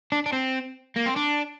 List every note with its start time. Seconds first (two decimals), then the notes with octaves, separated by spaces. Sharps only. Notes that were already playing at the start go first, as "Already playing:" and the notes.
0.12 D4
0.26 D4
0.33 C4
0.96 A#3
1.06 C4
1.17 D4